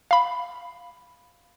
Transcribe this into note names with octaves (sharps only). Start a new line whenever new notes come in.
F5 B5